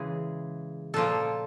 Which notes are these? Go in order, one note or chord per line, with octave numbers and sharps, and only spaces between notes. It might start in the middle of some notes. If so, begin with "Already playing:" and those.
Already playing: C#3 E3 G#3 G#4
A#2 F3 A#3 A4